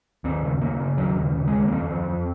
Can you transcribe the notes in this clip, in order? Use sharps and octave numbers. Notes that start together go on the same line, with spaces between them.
D#2 C4
C#3
C#3 A#3
C#3
D#2 F#3
C#3
C#3
G#3
D#2
A#3
F2 C4
F2
F2